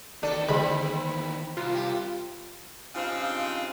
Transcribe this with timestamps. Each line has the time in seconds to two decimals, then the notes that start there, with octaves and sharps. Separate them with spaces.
0.23 E2 D#3 D4 A4
0.49 D3 E3 G#3 C4 B5
1.57 C2 F4
1.74 G4
2.95 G2 C#3 F3 C4 D#4 F4